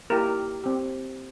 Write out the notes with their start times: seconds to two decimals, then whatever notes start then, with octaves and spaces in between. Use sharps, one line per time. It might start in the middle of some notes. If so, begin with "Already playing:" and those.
0.10 A#3 E4 G4 A#4
0.63 C4 G4